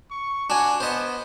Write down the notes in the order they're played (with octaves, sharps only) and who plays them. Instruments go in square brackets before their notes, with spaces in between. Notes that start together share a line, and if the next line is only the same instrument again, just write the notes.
[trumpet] C#6
[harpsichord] D4 G#5 [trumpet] F#4
[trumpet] B3 [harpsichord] C5 D#5